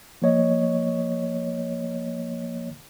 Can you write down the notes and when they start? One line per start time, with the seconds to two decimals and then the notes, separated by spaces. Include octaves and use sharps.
0.22 F3 A#3 C#5 D#5